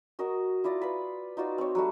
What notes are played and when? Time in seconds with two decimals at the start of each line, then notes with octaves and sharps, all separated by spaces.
0.19 F#4 A#4 D#5
0.64 E4 F4 D5 A#5
0.82 B4 F5 B5
1.37 D#4 F4 F#4 D5
1.58 C4 C#5
1.75 F#3 G3 A3